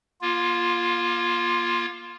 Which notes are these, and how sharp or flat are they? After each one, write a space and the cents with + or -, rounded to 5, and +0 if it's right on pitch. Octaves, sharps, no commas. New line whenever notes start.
A#3 +35 F4 +0